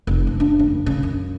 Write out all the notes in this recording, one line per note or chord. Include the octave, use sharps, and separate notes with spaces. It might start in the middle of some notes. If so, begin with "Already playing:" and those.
F1
F3
D4
F#1
C#3
F#2